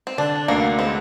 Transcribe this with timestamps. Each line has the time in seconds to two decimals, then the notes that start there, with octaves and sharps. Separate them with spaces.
0.07 C4
0.18 D3 D4
0.48 D2 A#3
0.78 G#3 C4